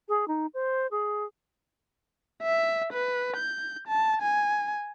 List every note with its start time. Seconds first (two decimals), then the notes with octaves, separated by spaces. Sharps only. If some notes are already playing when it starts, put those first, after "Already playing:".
0.09 G#4
0.28 D#4
0.54 C5
0.91 G#4
2.43 E5
2.93 B4
3.36 G6
3.87 A5
4.22 G#5